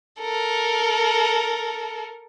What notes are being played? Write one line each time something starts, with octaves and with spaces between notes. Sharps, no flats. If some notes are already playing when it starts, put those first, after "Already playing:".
A4 A#4